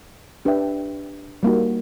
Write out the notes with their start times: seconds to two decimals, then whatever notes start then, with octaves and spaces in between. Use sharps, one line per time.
0.45 D4 G4 B4 E5 G5
1.43 G3 A#3 D#4 F#4